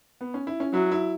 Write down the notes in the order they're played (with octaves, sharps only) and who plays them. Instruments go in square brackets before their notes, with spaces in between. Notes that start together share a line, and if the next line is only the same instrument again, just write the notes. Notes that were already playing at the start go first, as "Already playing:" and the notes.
[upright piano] B3
C#4
E4
C#4
[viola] F#3 [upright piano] E4
[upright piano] E4